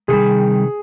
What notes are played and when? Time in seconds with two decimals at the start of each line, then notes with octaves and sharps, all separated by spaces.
0.08 C3 D#3 G3 G#4